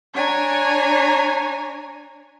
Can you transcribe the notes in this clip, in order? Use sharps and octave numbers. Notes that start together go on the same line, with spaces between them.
D4 C#5 G#5 A#5